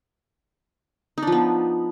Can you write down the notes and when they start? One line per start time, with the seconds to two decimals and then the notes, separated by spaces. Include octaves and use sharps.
1.18 D#4
1.22 D4
1.27 F3
1.32 B3